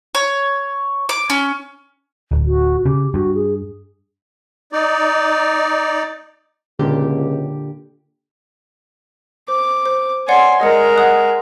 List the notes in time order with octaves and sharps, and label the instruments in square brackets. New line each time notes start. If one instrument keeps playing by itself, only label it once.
[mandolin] C#5
D6
C#4
[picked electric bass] D1
[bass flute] F#4
[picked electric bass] C#3 [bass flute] G4
[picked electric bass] G2 [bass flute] F#4
[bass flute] G#4
[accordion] D#4 D5
[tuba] C#2 [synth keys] A#2 D3 G4
[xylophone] C5 [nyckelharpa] D6
[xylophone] C5
[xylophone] C#5 D5 F#5 [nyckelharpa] G#5 C6
[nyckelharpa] G#3 A#4 [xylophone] D#5 D#6 C#7
[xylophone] F#5 D#6 F#6